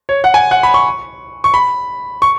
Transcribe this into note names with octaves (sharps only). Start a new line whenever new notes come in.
C#5
F#5
G#5
F#5
B5
C#6
C#6
B5
C#6